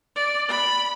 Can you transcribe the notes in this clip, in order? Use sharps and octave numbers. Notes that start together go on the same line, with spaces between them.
D5
B5